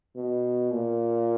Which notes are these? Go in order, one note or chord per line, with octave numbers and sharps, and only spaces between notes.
B2
A#2